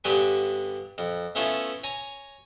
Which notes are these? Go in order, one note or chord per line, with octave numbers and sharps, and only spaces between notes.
G2 D3 B3 G4 G#5 C#6
F2
A3 B3 C#4 E4 F4
C#5 G#5 A#5